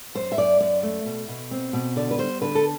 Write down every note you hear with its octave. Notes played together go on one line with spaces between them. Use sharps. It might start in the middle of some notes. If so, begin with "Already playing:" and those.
F#2 C5
E5
F#2 D5
F#2 D5
A3
B2
B2
C4
B2
D3 D5
B4
G3 C5
D3 B4
A4